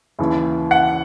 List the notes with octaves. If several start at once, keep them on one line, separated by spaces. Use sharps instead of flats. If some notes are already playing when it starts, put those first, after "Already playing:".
D#2 C#3 E3
F#5